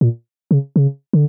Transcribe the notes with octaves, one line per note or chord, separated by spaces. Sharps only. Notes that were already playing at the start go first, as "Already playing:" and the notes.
A#2
C#3
C#3
D3